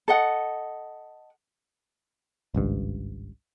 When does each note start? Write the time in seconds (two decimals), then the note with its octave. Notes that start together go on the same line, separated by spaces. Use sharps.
0.08 A4 D#5 F#5
2.54 G#1 C#2 G2